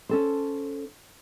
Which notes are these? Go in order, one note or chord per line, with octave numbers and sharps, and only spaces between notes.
C#4 A4 C5